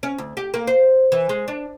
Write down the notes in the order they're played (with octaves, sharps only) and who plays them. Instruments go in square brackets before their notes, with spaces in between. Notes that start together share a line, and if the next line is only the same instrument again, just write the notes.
[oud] C#4
D2
G4
A#3
C5
E3
G#3
D4